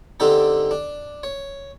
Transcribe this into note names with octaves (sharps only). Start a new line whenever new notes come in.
D3 C4 D4 D#4 G4 A4
D4
C#5